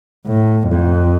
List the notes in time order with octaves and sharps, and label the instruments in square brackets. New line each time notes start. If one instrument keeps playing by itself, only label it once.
[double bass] A2
F2